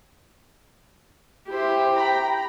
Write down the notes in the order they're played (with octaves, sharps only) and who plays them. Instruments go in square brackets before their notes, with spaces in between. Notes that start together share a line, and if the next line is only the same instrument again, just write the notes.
[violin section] E4 C5 [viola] G4
[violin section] G5 A#5 B5